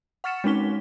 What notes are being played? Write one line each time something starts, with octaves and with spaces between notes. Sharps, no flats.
F#5 C#6 F6 A6 C#7 E7
G#3 C4 C#4 D#4 B6 G7